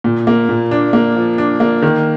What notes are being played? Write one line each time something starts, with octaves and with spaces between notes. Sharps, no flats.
A#2
A#3
A#2
D4
A#3
F3
D4
A#3
D#3